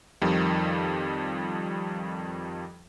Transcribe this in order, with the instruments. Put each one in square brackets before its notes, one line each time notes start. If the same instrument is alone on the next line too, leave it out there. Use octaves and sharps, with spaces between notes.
[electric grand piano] F2 D#3 F3 G3